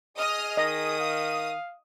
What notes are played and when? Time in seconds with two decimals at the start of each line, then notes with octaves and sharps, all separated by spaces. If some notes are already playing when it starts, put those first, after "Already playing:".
0.17 G#4 D#5 D#6 F6
0.57 D#3 D#5 D#6
1.00 F5